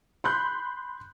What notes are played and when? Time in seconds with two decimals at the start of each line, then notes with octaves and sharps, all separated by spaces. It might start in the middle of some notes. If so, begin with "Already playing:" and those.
0.24 B5 C6 F#6 G6